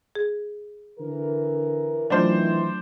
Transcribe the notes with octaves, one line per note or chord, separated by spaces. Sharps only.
G#4
D3 E3 A#4
D#3 E3 F#3 A3 D4 F4 C5